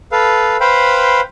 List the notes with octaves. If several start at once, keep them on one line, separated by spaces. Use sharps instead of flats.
A4 B4 F5
B4 C5 F5 G5 B5